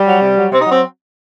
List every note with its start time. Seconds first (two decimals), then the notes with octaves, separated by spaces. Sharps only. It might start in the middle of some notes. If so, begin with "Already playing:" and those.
Already playing: G3
0.08 F#3
0.23 C3
0.37 F#3
0.52 C3 C4
0.61 D#4
0.67 F#3 C4